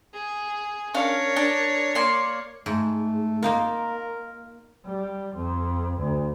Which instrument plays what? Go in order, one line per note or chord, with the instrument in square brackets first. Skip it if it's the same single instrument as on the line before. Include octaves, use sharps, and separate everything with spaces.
[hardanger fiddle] G#4
[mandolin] C#4 D4 F5 [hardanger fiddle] A#4 C#5
[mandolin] D4
A#3 D5 C6
[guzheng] G#2 [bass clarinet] A3
[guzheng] A#3 D#4 F4 [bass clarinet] A#4
[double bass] G3
F2
D2